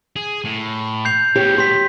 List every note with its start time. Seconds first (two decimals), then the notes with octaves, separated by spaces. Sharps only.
0.16 G#4
0.44 A2
1.05 G6 C7 F7
1.36 D2 B2 G4 C#5
1.58 G4 C6 B6